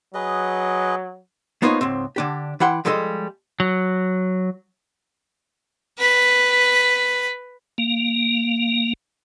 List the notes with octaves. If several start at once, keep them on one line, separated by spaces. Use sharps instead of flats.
F#3 G#4 B4 D#5
A#3 B3 D#4 F4 C5 C#5
C#2 G#2 C4
D3 D4 G4
E3 E4 F#5 G5 C6
F3 G3 G#3 A4 D#5
F#3
B4 B6
A#3